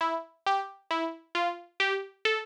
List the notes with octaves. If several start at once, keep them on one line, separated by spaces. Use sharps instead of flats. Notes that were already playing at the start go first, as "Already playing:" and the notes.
E4
G4
E4
F4
G4
A4